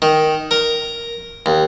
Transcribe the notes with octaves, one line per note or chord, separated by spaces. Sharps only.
D#3
A#4
D#2